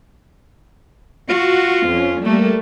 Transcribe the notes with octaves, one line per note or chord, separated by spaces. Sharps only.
F4 F#4
F2 C#4
G3 A3 A#3